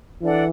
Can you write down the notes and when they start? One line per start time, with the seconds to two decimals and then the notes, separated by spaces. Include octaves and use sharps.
0.22 E3 D4 A4 D5 F#5